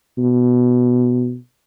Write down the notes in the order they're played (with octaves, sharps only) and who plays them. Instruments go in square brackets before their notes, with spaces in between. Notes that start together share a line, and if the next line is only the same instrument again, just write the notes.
[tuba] B2